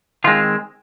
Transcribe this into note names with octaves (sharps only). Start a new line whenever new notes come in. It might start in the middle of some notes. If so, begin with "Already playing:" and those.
D#3 G#3 C4 F4